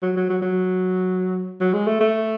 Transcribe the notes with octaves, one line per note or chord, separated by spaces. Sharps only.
F#3
F#3
F#3
F#3
F#3
G#3
A3
A3